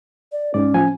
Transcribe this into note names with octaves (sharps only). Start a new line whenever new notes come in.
D5
G#2 C#4 D5
A2 F3 G#5